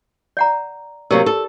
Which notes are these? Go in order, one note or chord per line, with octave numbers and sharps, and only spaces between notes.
D5 F#5 A#5
C3 F#3 A#3 G4 A#4
A4